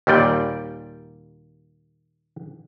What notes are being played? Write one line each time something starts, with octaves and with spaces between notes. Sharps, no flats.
D#2 A#2 G3 D5 G5